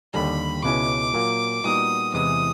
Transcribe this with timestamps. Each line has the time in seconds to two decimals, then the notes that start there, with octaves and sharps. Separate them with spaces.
0.14 D#2 D3 G3 B5
0.64 C#2 B2 G#3 C#4 E4 D6
1.14 A#2 F#3 A#3
1.64 A#2 G3 B3 D#4 F#4 D#6
2.14 E2 C3 E3 G#3 D#6